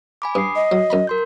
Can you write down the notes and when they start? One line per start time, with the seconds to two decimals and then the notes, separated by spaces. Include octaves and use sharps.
0.22 G#5 B5 D6
0.35 G2 D#6 C7
0.56 D#5
0.72 F#3
0.90 F#2 A#5 B5
1.07 A#4 C6 G6